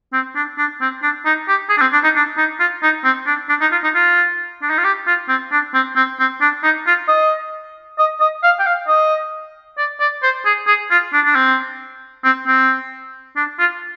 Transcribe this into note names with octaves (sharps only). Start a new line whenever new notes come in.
C4
D4
D4
C4
D4
D#4
G4
G#4
D4
C4
D4
D#4
D4
D#4
F4
D#4
C4
D4
D4
D#4
F4
D#4
F4
D4
D#4
F4
G4
F4
C4
D4
C4
C4
C4
D4
D#4
F4
D#5
D#5
D#5
F5
G5
F5
D#5
D5
D5
C5
G#4
G#4
F4
D4
D4
C4
C4
C4
D4
F4